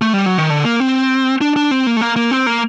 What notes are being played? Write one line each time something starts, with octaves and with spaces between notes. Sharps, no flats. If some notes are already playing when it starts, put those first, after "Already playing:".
A3
G3
F#3
D#3
D3
A#3
C4
D4
D4
C4
A#3
A3
A#3
A#3
C4
A#3